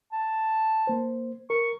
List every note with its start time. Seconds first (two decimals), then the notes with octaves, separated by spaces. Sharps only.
0.12 A5
0.87 A#3 C5
1.50 A#4 C#6